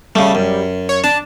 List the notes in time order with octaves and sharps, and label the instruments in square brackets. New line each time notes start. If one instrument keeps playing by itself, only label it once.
[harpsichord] C#3 A3 [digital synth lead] G3
[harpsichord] F#2
[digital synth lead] C#5
[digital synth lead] D4 [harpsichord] A5